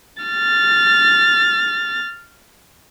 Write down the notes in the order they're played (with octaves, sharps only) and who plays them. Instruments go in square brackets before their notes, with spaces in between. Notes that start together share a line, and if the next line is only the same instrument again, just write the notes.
[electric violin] F6 A6